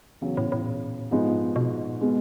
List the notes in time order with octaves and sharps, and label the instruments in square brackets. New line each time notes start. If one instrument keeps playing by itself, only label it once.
[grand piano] E2 C#3 F#3
[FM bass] A2
A2
A#2
[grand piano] G#2 F3 G#3 B3 D#4
[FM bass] B2
A#2
[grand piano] B2 G#3